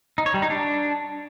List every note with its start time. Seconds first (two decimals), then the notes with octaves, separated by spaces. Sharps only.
0.18 D#4
0.26 C#5
0.34 G3
0.42 D#4
0.50 D4